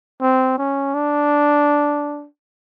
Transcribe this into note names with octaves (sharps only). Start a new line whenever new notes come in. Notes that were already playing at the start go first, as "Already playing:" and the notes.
C4
C#4
D4